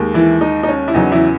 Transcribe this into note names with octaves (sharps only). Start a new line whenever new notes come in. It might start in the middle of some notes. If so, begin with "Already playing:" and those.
Already playing: D#2 D#3 G#3
E3 E4
D#4
D#4
C#4
E4
E2 C#3 F#3 D#4
E3 E4